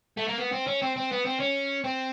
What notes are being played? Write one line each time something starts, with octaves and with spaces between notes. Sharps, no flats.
A3
A#3
B3
C4
C#4
C4
C4
B3
C4
C#4
C4